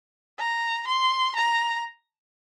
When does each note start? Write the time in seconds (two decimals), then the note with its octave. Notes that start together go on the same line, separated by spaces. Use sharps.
0.39 A#5
0.87 C6
1.36 A#5